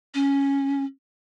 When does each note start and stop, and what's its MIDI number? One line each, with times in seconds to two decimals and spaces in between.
0.14 0.84 61